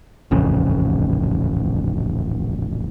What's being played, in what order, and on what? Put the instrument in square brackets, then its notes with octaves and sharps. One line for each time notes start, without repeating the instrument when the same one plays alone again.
[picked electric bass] D#1 A1 F2 C#3